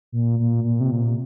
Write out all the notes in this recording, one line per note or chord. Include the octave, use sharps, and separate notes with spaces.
A#2
A#2
A#2
C3
A#2